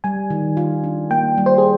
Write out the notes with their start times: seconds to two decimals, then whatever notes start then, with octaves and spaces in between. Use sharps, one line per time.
0.04 G3 G#5
0.30 D#3
0.57 F4
0.84 D4
1.11 A#3 G5
1.38 G3
1.46 C5
1.58 G#4